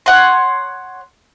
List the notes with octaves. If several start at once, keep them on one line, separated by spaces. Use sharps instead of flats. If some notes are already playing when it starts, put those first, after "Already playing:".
C#5 F#5 C6